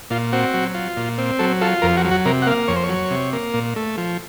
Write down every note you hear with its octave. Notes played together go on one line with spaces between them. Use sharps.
A#2 F4
C4 F#4
F#3
F4
A#2
C4
F#3 A4
F4 A4
F2 A#4
F#4
F#3
F#4
C3 A#4
F#5
A#3 F5
F2 C#5
C5
C#5
F#3
C3
A#3
A#2
A3
F3